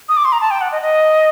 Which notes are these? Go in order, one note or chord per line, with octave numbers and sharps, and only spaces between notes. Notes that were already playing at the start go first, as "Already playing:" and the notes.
D#6
D6
C6
A#5
A5
G5
F#5
D#5
D#5